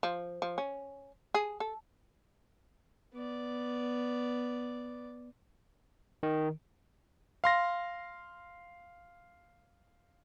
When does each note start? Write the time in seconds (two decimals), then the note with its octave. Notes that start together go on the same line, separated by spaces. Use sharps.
0.03 F3
0.42 F3
0.58 C#4
1.34 G#4
1.60 A4
3.14 B3 D5
6.23 D#3
7.44 F5 C6 A#6